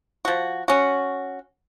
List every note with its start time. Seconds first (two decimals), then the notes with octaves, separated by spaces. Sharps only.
0.25 F3 F#4
0.68 C#4 F#4